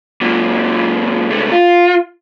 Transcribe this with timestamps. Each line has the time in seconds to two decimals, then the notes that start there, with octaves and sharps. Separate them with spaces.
0.21 F#2 A#2
1.30 C#2 A3
1.51 F4